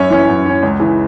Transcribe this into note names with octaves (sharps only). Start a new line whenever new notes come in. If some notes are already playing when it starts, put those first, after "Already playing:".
Already playing: F#2 C#4 C#5
E3 C#4
F#2
E3 C#4
C#2
C#3 E3